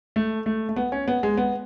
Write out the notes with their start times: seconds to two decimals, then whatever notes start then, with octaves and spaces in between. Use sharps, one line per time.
0.16 A3
0.46 A3
0.69 A3
0.76 B3
0.92 C#4
1.08 B3
1.23 G#3
1.37 B3